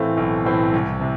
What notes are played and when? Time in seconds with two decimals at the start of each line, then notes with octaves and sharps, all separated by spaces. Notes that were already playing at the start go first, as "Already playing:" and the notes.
Already playing: A2 E3 A3 C4 F5
0.17 B1
0.45 A2 E3 A3 C4
0.73 C2
1.01 C3